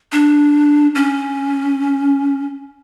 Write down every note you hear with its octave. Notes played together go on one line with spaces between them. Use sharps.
D4
C#4